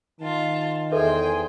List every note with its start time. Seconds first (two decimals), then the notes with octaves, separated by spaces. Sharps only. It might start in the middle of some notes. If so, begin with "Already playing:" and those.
0.20 D#3 F4 A5
0.92 E2 G#4 A4 B4 C5 E5 G5 G#5